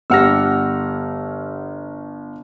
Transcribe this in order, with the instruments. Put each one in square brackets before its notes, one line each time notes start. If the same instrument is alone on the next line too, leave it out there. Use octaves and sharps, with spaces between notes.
[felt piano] G1 F6 A#6 [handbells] G4 F#5 E6